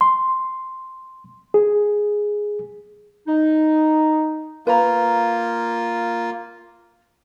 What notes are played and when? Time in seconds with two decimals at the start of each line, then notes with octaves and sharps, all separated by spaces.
0.01 C6
1.54 G#4
3.28 D#4
4.67 A#3 F4 B4 A#5